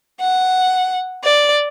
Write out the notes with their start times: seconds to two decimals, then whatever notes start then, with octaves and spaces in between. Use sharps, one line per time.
0.20 F#5
1.24 D5